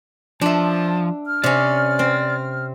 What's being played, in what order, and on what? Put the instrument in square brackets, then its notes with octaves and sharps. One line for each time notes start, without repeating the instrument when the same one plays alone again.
[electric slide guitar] F3 [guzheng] D4 E5 [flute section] A5 C6
[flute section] F6
[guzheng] C3 C#4 [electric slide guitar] D5
[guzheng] C4